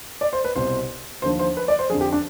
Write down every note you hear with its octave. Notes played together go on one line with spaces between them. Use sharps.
D5
C5
B4
C2 B2 C5
D#2 D3 F3 C5
C5
B4
D5
C5
F2 D3 F3 G#4
G4
D4